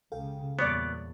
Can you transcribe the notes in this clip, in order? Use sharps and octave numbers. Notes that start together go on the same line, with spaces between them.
C#2 C#3 A4 F5 G5
E2 A#2 G3 B3 C#5 D5